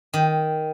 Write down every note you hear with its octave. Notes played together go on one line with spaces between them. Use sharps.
D#3